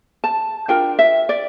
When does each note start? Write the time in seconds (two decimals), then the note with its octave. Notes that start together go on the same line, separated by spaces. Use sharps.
0.24 A5
0.68 D4 F4 A#4 G5
0.99 E5
1.29 D5